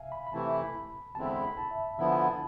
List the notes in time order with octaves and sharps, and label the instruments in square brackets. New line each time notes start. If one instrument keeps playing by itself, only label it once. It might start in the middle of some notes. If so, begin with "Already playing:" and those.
Already playing: [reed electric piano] E5 F5 G#5
B5
B5
[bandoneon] C3 E3 A3 E4 [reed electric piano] A5
[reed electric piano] B5
[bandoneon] E2 D3 G#3 C4 E4 [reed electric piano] A5
[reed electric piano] B5
B5
B5
A5
E5
[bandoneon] D3 F3 B3 E4 [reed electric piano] E5
[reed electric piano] G#5
A5